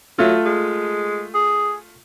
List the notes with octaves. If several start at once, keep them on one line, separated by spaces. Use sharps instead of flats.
F#3 A3 F4
G#3
G#4